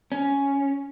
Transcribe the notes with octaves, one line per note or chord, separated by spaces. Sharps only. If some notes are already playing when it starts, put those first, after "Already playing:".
C#4